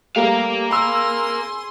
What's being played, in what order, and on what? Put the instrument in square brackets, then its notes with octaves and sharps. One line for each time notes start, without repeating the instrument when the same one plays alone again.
[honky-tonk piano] G3 A3 A#3 [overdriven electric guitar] A#4 F5
[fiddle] G#4 C6 [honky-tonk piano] B5 E6